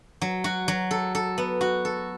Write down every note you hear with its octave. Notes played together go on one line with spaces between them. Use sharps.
F#3
F#4
F#3
A4
A4
B3
F#4
A4